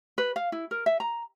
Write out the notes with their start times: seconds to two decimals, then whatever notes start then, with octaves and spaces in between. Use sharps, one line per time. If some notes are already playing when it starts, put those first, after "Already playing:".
0.18 B4
0.36 F5
0.52 E4
0.71 A#4
0.86 E5
1.00 A#5